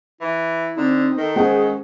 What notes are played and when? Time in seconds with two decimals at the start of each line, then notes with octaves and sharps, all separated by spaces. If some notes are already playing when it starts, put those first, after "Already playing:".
0.21 E3 E4
0.77 D3 C4 D#4
1.18 D#3 A4
1.36 G#3 C#4 G#4 C5 F#5